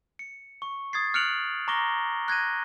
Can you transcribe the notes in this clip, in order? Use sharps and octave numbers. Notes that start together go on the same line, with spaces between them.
C#7
C#6
D#6 G#6 A6 C7
F6 F#6 C#7 D7 F7 F#7
A#5 C#6 D6 A#6 G7
F#6 G#6 A#6 D#7